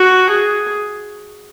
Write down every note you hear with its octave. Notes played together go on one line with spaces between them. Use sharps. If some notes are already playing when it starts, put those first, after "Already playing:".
Already playing: F#4
G#4